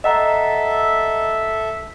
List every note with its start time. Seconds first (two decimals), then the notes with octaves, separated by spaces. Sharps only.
0.04 A4 D#5 E5 F#5 A#5